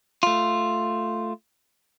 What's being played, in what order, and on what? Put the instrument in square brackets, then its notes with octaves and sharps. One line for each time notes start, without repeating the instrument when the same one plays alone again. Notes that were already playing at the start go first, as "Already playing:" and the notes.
[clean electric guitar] A3 F4